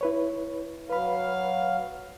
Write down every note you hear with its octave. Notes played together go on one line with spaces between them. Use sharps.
E4 B4 C#5
F#3 B4 F5 B5